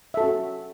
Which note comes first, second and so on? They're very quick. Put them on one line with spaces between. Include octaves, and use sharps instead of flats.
E5 A4 F#4 C#4